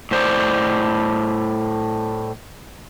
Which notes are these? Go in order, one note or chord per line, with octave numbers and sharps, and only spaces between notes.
A2 C5 D5